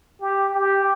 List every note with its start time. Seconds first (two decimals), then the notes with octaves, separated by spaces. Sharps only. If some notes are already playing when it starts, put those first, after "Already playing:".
0.21 G4
0.55 G4